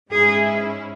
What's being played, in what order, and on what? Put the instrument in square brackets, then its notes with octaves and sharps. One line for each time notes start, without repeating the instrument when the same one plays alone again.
[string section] G#2 G#3 C#4 E4 [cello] G#4